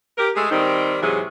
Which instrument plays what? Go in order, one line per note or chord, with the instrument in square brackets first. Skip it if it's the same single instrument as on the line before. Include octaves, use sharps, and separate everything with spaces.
[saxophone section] G4 A#4
G#3 A3 G#4
D#3 G3 C4 D#4
G#2 C3 E3 F#3 G#4